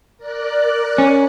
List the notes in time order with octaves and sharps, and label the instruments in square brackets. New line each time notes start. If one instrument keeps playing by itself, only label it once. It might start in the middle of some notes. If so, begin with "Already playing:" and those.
[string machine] A#4 D5 F#6
[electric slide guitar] C#4